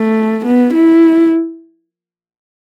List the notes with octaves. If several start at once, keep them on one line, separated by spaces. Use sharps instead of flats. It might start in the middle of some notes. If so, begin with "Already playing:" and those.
Already playing: A3
B3
E4